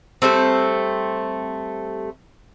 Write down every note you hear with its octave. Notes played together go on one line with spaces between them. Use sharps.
G3 A3 C4